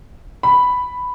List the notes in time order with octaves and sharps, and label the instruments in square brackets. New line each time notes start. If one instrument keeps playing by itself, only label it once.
[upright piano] B5